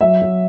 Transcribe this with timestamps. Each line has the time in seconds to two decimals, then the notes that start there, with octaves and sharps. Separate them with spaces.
0.01 F#3 E5
0.22 F#3